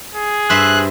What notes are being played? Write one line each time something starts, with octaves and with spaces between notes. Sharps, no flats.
G#4
G2 C5 E5 F#6